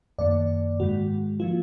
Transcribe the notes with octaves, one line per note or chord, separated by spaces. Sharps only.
F#2 D#3 A#3 D5
G#2 D#3 G#3 F#4
F3 A#3 F4